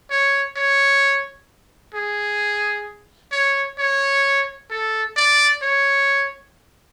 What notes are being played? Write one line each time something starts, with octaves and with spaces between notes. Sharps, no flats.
C#5
C#5
G#4
C#5
C#5
A4
D5
C#5